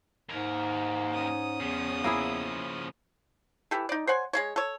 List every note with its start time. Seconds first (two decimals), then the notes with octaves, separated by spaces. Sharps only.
0.29 D#2 G#2 A#4
1.14 C#4 D#6
1.61 E2 C#3 F3
2.04 A#3 E4 G#4
3.71 E3 G4 A4
3.89 D#4 D5
4.07 C5 C#5 F#5 G#5
4.33 G#3 A#3 C#5
4.56 A4 C#5